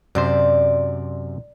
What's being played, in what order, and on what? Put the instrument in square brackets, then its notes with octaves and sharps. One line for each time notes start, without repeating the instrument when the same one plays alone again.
[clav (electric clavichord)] F#2 C3 C5 [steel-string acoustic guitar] D5